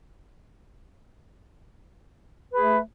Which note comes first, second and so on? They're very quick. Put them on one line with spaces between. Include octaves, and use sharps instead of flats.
B4 G#4 A3